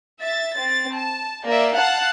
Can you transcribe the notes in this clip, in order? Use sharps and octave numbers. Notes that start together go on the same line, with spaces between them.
E5 A6
C4 A6
A5
A#3 D5 E5
F5 F#5 A5 F#6